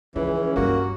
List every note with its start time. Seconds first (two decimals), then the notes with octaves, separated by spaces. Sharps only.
0.16 C#2 E3 F3 C#4
0.56 G2 G3 A#3 F#4